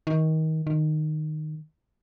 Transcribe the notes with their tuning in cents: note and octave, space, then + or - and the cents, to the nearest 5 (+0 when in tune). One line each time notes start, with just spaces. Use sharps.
D#3 +25
D#3 -15